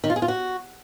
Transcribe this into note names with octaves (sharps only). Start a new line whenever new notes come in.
D#3
F4
G#4
F4
F#4